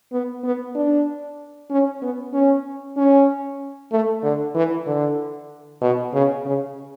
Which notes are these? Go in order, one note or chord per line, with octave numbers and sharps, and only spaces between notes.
B3
B3
D4
C#4
B3
C#4
C#4
A3
D3
E3
D3
B2
C#3
C#3